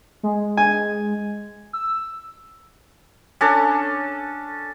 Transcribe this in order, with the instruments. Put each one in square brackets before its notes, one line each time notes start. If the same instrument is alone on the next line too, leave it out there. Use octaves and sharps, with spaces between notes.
[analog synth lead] G#3
[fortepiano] G#5
[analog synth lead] E6
[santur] C#4 D4 A4